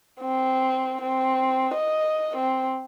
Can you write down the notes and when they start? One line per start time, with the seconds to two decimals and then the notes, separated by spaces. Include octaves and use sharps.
0.21 C4
1.01 C4
1.74 D#5
2.37 C4